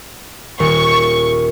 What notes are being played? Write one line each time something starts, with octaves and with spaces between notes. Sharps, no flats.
D#1 C#6 C#7